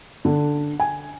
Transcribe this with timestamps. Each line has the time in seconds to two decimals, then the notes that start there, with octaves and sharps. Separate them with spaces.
0.25 D3
0.80 G#5